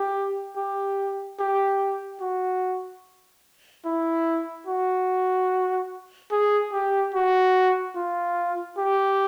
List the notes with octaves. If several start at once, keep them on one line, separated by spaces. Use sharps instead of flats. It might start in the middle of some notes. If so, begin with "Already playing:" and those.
Already playing: G4
G4
G4
F#4
E4
F#4
G#4
G4
F#4
F4
G4